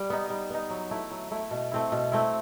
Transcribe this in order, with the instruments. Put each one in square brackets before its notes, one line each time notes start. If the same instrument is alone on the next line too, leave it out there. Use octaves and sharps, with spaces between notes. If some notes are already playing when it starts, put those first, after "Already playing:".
Already playing: [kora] G3
B3 D#4
G3
B3 D#4
F#3
A3 E4
F#3
A3 E4
B2
A3 C4 E4
B2
A3 C4 E4